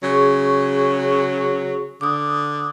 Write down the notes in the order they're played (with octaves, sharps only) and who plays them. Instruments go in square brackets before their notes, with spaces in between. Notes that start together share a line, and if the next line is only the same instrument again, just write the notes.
[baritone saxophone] C#3 [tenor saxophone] F#3 [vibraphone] G#4 C#6
[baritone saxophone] D3 [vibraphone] D6 D#6